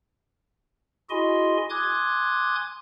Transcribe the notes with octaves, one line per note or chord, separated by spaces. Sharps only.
E4 F#4 G#4 D#5 G#5 C6
G#5 C6 D6 D#6 F#6 G#6